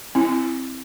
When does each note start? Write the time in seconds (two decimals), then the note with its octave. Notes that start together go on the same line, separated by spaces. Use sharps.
0.15 C4 E4